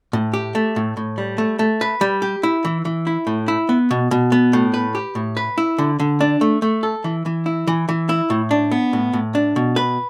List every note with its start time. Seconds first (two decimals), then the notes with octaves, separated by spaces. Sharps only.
0.13 A2
0.33 G4
0.55 A3
0.76 A2
0.97 A2
1.18 G3
1.38 A3
1.59 A3
1.81 B4
2.01 G3
2.22 G4
2.43 E4
2.65 E3
2.85 E3
3.07 E4
3.27 A2
3.48 E4
3.69 B3
3.91 B2
4.11 B2
4.32 B3
4.53 A2
4.74 B4
4.95 G4
5.15 A2
5.37 B4
5.58 E4
5.78 D3
6.00 D3
6.21 D4
6.41 A3
6.62 A3
6.83 A4
7.04 E3
7.26 E3
7.46 E4
7.67 E3
7.89 E3
8.09 E4
8.30 A2
8.51 D4
8.71 B3
8.93 A2
9.13 A2
9.35 D4
9.56 B2
9.76 B4